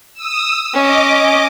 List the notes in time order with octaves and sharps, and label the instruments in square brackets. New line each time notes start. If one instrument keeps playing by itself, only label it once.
[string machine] D#6 E6
[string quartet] C#4 [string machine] D#5 D6